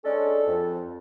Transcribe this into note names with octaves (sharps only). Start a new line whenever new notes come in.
G#3 C#4 D4 A4
F2